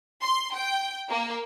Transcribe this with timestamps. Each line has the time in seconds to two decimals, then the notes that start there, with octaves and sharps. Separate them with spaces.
0.22 C6
0.54 G5
1.09 A#3